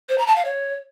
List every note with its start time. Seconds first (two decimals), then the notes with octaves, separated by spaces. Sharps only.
0.09 C5
0.18 A#5
0.27 A5
0.36 F5
0.45 C#5